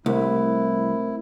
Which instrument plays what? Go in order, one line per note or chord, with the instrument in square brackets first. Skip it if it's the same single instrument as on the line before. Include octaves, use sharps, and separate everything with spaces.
[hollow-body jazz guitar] C2 [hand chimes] A3 A#4 C5 [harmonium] E4